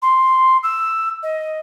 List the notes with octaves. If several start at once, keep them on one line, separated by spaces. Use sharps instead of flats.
C6
E6
D#5